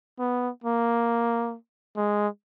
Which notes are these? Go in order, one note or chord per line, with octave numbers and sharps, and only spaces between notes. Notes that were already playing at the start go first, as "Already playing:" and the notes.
B3
A#3
G#3